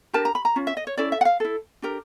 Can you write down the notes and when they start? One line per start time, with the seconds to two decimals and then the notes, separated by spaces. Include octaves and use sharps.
0.13 D4 G4 A#4 A5
0.25 A#5
0.35 B5
0.45 A#5
0.56 C#4 F4
0.67 E5
0.77 D#5
0.87 C#5
0.97 C#4 E4 A4 D5
1.12 E5
1.21 F#5
1.25 F5
1.40 E4 A4
1.82 D4 G4 A#4